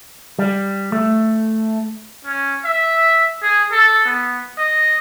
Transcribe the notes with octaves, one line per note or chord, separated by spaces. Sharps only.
G3
A3
C#4
E5
G#4
A4
B3
D#5